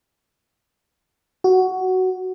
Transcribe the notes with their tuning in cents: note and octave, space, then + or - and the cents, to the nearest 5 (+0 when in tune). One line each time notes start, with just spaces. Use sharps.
F#4 +10